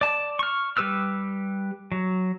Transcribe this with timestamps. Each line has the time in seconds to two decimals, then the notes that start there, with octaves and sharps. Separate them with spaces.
0.01 D5 A5
0.39 C#6 F6
0.77 G3 G4 B4 E6 F6
1.92 F#3